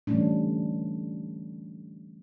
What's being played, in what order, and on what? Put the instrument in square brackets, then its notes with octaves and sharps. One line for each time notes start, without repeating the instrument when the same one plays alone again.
[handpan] D3 E3 G3 A3 C#4 D4